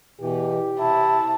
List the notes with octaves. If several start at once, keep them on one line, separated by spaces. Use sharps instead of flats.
E2 B2 E3 G4
C3 E4 A5